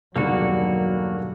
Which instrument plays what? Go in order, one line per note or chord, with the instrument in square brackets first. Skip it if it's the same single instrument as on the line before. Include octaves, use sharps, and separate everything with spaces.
[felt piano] E1 D#3 [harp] G2 D3 [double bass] F#3 [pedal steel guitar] A#3 F#4